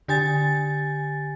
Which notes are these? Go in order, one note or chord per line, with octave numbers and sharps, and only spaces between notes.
D3 G4 G#5 A6